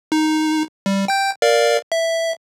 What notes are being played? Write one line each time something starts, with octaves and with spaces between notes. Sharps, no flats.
D#4
G3
G5 G6
A#4 D5 F5
E5